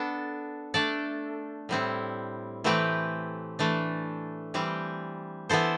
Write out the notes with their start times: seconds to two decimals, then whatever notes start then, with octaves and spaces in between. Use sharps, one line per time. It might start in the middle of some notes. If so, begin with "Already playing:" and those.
Already playing: B3 D4 A4
0.74 A3 D4 A4 D5
1.69 A2 G3 C4 E4
2.64 E3 A3 C4 G4 B4
3.59 E3 A3 D4
4.54 E3 G3 C4 G4
5.49 E3 B3 E4 A4 C5